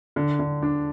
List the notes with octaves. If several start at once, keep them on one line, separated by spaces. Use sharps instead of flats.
D3
D3
D4